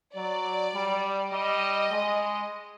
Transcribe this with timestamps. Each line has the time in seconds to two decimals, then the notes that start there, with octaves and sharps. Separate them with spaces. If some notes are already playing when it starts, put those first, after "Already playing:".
0.15 F#3 D5
0.74 G3
1.32 G3 D#5
1.91 G#3